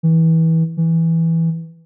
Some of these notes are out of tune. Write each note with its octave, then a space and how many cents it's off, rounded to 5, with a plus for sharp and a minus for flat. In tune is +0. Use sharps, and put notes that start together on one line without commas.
E3 -25
E3 -5